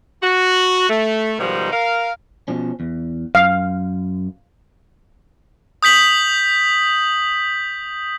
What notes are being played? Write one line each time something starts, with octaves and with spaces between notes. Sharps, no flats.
F#4
A3
B2 D#3 F3 G3 G#3 D#4
A#4 F5
B2 F3 C#4
E2
F#2 F5
D#6 G6 B6 F#7